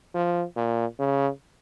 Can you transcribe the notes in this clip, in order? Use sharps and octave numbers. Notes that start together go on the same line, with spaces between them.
F3
A#2
C#3